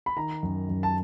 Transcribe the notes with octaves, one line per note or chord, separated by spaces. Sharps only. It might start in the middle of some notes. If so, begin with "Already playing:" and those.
B5
D#3 A#5
F#2
F#2
A5